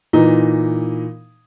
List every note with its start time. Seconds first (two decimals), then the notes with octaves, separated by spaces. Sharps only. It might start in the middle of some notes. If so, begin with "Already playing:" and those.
0.13 A#2 E3 D#4